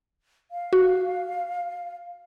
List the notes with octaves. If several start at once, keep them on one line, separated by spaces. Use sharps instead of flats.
F5
F#4